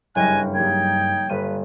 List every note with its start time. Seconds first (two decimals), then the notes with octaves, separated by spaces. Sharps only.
0.16 F#1 G2 C#4 D#5 G5 G#5 F#6
0.54 G3 A#3 D#4 G5 G#6
1.29 G1 G2 B4 D#7